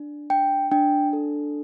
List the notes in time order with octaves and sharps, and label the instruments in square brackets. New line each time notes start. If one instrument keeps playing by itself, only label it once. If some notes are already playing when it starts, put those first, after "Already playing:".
Already playing: [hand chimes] D4
D4 G5
D4 G5
A4